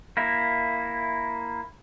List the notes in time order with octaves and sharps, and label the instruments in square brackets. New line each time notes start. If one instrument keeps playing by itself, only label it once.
[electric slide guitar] A#3 E4